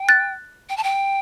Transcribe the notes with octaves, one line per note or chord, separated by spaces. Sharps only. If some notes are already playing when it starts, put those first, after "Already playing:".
Already playing: G5
F#6 A6
G5
A5
G5